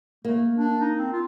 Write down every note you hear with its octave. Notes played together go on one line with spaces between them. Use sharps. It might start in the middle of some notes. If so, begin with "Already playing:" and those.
A3 A#3
D4
D#4
C4
F4